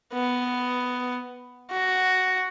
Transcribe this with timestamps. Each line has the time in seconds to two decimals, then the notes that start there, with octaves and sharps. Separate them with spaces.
0.13 B3
1.72 F#4